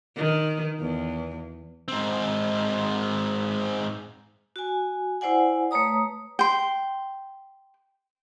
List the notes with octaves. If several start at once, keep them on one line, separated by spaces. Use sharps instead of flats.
D#3
E2
G#2 C4
F#4 G#5
E4 C5 D5 F#5 G#5
A3 B4 C#5 A#5 D#6
G5 C6